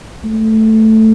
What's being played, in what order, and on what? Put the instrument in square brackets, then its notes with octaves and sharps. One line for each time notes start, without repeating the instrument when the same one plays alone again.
[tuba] A3